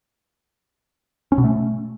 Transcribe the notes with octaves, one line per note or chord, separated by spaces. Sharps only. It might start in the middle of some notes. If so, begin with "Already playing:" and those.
C#4
B2
A3